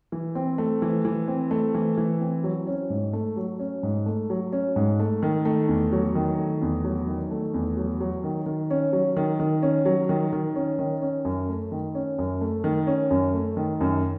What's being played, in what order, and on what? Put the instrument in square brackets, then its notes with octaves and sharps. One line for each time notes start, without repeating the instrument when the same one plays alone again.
[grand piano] E3
C4
A3
E3
E3
C4
A3
E3
E3
C4
F#3
C#4
G#2
A3
F#3
C#4
G#2
A3
F#3
C#4
G#2
A3
D#3
A3
E2
F#3
D#3
A3
E2
F#3
D#3
A3
E2
F#3
F#3
D#3
D#3
C#4
F#3
D#3
D#3
C#4
F#3
D#3
D#3
C#4
D#3
C#4
F#2
A3
D#3
C#4
F#2
A3
D#3
C#4
F#2
A3
D#3
F#2